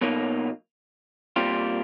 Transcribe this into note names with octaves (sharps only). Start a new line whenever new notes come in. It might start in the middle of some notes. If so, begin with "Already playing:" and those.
B1 B2 F#3 A#3 D#4
A#2 G3 C4 F4